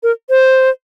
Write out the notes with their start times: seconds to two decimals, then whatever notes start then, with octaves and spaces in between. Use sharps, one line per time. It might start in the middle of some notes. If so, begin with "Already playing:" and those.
0.03 A#4
0.30 C5